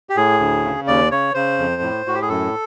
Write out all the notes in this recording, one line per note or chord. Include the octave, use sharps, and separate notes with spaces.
G4
A2 G#4
D2
C#3
D#2 D5
C#3 C#5
C#3 C5
F2
A2
A2 F#4
G4
G#4
F#2 A4